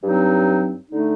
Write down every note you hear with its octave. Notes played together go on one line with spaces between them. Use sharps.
G2 F#3 C4 D#4
D3 A3 D#4